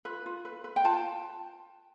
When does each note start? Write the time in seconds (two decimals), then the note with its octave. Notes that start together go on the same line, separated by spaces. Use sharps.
0.05 F4 B4
0.26 F4
0.45 B4
0.64 B4
0.76 G5
0.85 F4 A5